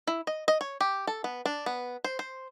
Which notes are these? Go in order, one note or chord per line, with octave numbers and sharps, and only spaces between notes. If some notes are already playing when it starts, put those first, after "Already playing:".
E4
D#5
D#5
C#5
G4
A4
B3
D4
B3
C5
C5